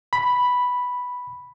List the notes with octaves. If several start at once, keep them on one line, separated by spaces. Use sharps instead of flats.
B5